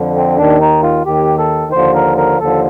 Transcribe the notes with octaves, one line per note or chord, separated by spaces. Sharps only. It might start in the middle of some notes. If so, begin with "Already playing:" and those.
Already playing: F2 D3 F3
C4
D#2 D#3 D4
D#4
F4
D#2 D#3 G4
A4
D#2 D3 F3 C5
A#4
A#4
D#2 D3 F3 A4